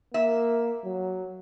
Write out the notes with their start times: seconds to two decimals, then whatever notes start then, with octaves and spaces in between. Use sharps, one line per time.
0.14 A#3 E5
0.85 F#3